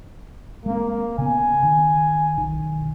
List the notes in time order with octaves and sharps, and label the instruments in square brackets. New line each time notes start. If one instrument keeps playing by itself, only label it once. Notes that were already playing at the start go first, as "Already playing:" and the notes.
[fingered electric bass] G#3 C4 [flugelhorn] A#3
[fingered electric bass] C#3 A#3 B3 [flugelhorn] G#5
[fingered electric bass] D#3
B1 D#3